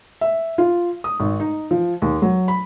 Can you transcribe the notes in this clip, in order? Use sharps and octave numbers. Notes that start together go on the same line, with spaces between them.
E5
F4
D#6
G#1
D#4
F3
D#2
F#3
B5